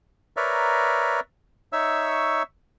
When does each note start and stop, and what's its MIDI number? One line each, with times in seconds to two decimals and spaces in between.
0.37 1.20 70
0.37 1.20 71
0.37 1.20 73
0.37 1.20 74
0.37 1.20 76
0.37 1.20 82
1.73 2.43 63
1.73 2.43 73
1.73 2.43 76
1.73 2.43 85
1.73 2.43 88